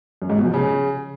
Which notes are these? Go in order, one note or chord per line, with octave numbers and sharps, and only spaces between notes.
F#2
G#2
B2
F3
C#3